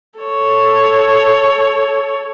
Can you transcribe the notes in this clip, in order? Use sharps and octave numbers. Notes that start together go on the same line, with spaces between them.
A4 C#5